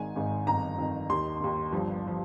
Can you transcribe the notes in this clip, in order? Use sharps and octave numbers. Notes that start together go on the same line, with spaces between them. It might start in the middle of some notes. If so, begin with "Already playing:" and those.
Already playing: G#1 G#2 D#3 G#5
G#1 G#2 D#3
G1 F2 D#3 A#5
G1 F2 D#3
D#2 D#3 C6
D#2 D#3
G1 G2 F3
F3